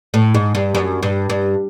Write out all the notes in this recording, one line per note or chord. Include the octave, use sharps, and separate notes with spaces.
A2
G#2
G2
F#2
G2
G2